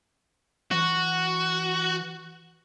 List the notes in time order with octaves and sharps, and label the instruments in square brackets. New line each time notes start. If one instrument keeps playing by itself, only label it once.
[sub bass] E3 [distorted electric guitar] F#4